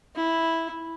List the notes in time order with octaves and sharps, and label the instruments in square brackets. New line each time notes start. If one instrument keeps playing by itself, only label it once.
[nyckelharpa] E4